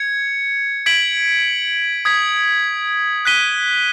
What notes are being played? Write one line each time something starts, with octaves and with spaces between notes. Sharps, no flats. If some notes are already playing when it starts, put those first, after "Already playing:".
Already playing: G#6 C#7
G#6 B6 D7 F#7
D#6 G#6 B6
F#6 B6 D#7 G7